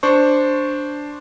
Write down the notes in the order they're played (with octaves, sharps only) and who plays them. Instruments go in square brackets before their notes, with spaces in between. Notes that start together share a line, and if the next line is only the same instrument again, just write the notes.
[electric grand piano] D4 C5 C#6